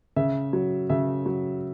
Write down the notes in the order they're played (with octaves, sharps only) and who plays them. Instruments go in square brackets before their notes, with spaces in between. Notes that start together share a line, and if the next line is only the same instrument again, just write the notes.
[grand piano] C#3 E5
F#3
C#3 E5
F#3